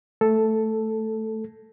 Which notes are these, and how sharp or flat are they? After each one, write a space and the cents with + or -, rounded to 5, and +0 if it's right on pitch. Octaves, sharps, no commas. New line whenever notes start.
A3 +0 A4 +0